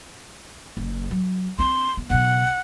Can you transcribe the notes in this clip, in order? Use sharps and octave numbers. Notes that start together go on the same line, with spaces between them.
F#1
F#3
C4 D4 C6
B3
B1 C#3 F#5